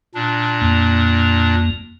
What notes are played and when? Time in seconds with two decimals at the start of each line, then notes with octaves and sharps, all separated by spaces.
0.15 A#2 D4
0.62 F2 A#3